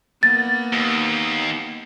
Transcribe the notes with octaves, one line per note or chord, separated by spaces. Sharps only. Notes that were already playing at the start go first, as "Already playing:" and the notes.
A#3 B3 A6
D#2